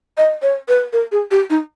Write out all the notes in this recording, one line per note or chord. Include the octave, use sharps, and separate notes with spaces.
D#5
C#5
B4
A#4
G#4
G4
D#4